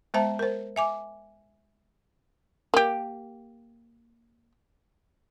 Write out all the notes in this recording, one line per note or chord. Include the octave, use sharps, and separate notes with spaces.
G#3 B3 C5 E5 A5 A#5
A#4 C5
E5 G#5 D6
A#3 G4